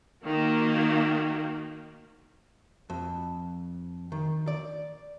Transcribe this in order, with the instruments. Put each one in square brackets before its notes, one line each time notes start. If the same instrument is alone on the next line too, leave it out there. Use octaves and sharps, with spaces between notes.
[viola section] D#3 A#3 F#4
[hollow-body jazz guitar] F2
D#3
D5